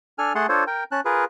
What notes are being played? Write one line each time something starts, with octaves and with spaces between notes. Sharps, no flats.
D4 A4 G#5 F6
A3 G#4 F#5 A5 C6
D4 F4 A4 C5 C#5
A#4 G5
C#4 A5 F#6
F4 G#4 A#4 B4